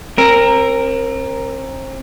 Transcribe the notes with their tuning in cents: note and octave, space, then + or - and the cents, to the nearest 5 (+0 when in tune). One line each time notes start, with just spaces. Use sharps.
C4 +35 A#4 +0